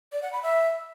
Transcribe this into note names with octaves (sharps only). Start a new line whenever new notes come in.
D5
F#5
B5
E5